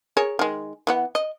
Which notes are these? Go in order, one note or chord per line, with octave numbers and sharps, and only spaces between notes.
G#4 A#4 C#5
D#3 G#3
E3 B3 F#5
D#5